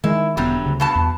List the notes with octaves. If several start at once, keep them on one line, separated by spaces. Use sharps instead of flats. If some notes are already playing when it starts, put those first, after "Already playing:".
D#3 G#3 E4
E1 D3 F#3 G3 B3
D2 C#3
G2 B2 A5
E2